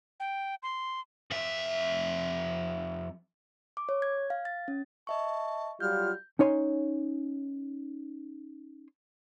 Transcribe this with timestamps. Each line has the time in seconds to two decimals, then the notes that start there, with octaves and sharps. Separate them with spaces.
0.20 G5
0.63 C6
1.31 F2 E5
3.77 D6
3.89 C#5
4.02 G#6
4.30 F5
4.45 A6
4.68 C#4
5.07 D#5 E5 A5 C#6
5.80 F#3 G3 F4 F6 G6
6.39 C#4 D#4 C#5 G#5 C6